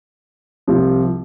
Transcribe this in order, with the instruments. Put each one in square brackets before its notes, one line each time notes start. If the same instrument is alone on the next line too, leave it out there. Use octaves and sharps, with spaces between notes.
[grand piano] C2 C3 F3